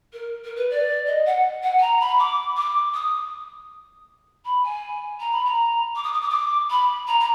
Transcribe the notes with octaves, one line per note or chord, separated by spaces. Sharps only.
A#4
A#4
B4
D5
D#5
F#5
F#5
G#5
A#5
B5
D6
D6
D#6
B5
G#5
A#5
B5
A#5
D6
D#6
D6
D#6
D6
B5
A#5
A#5